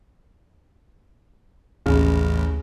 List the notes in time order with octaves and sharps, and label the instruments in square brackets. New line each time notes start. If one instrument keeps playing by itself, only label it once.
[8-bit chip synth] A1 [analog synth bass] D#2 [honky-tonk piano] C#3